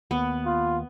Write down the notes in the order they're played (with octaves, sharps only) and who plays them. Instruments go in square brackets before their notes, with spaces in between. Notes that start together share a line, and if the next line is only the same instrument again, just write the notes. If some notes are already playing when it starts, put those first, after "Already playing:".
[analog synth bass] D#2 [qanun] B3
[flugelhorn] F4